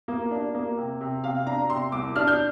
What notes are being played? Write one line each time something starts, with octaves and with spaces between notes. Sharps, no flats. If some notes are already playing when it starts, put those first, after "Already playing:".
A#3
D4
A#3
C3
C3
C3 F5
D4 A#5
C3 C6
C2 D6
D4 F6
G6